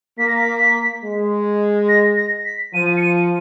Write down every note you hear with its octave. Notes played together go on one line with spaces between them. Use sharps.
A#3 B6
A#6
B6
G#3
A#6
A#6
B6
F3 D#7
C#7
D#7